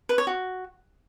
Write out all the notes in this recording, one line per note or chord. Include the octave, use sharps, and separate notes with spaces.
B4
C#5
F#4